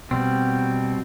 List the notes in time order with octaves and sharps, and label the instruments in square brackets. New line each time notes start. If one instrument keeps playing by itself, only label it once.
[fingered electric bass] B2 [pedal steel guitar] G3 C4